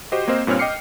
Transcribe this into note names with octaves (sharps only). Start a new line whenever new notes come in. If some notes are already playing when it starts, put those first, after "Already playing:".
F#4 G4 C5 D#5
A#3 C4 A#4 C5 D#5
G2 A#2 C4 C#5 F6
D#5 G5 D6 C7 C#7